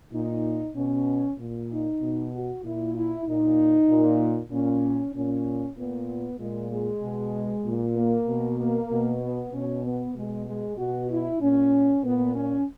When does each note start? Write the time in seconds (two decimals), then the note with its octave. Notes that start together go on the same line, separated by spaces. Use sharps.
0.12 A#2 D#4
0.75 B2 C#4
1.38 A#2
1.70 D#4
2.00 B2
2.33 F#4
2.63 A#2 E4
2.95 E4
3.26 A#2 D#4
3.88 A#2
4.51 A#2 C#4
5.14 A#2 C#4
5.77 A#2 B3
6.39 A#2 G#3
6.71 G#3
7.02 B2
7.65 A#2
7.96 A#3
8.27 B2
8.58 A#3
8.91 B2
9.22 B3
9.52 B2 C#4
9.84 B3
10.15 B2 G#3
10.47 G#3
10.78 B2 F#4
11.10 E4
11.40 A#2 C#4
12.03 A#2 B3
12.35 C#4